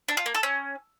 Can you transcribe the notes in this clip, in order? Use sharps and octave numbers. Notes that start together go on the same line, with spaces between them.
D4
F4
A#3
A4
C#4